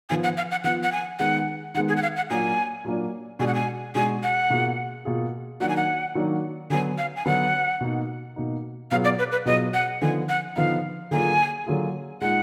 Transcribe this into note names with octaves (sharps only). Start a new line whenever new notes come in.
F3 B3 F4 G#5
F#5
F5
F#5
F3 B3 F4 F#5
F#5
G#5
D#3 G#3 B3 F#5
D#3 G#3 B3 F#5
G#4
F#5
F5
F#5
A#2 F#3 A#3 D4 G#5
A#2 F#3 A#3 D4
B2 G#3 D4 F#4 G#5
F#5
G#5
B2 G#3 D4 F#4 G#5
F#5
B2 A#3 F4 G#4
B2 A#3 F4 G#4
D#3 F#3 A#3 D4 F#4 F#5
G#5
F#5
D#3 F#3 A#3 D4 F#4
D3 F#3 B3 G#5
F5
G#5
D3 F#3 B3 F#5
B2 A#3 D#4
B2 A#3 D#4
B2 F#3 B3 F4 G#4 F5
D5
B4
B4
B2 F#3 B3 F4 G#4 D#5
F#5
D3 F3 B3 D#4 G#5
F#5
D3 F3 B3 D#4 F5
D3 F#3 A#3 F4 G#4 G#5
D3 F#3 A#3 F4 G#4
A#2 G#3 D#4 F#5